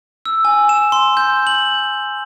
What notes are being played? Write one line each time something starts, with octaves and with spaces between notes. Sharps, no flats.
E6
G#5
E7
C6
G6
F#7